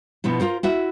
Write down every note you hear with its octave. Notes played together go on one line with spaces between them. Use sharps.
B2 F3 B3 E4
F4 A#4 C5
E4 F#4 E5